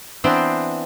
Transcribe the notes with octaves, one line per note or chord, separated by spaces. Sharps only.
E3 B3 C4 D4 C5